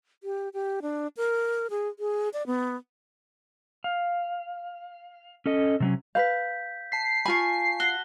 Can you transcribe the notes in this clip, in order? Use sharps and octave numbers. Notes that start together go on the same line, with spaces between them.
G4
G4
D4
A#4
G#4
G#4
D5
B3
F5
C#4 A4 D#5
C3 F#3 C#4
B4 F5 G6 B6
A5 B6 C7
F4 G#5 B5 C#6
F#4 G7